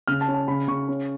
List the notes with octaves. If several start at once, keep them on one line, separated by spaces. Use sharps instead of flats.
C#3 F6
A5
C#4
A5
C#3 B5
C#3 C#6
C#4